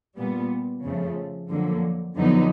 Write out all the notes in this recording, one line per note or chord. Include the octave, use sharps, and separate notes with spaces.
A#2 G3 B3
F2 C#3 F3 A3
F2 D3 F#3 A#3
F2 D3 F#3 B3 D#4